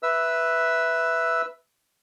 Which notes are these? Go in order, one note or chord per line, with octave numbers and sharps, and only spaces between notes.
B4 E5 E6